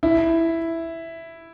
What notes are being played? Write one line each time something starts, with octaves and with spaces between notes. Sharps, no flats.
E4